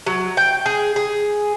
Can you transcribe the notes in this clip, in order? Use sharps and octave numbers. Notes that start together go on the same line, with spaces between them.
F#3
G5
G#4
G#4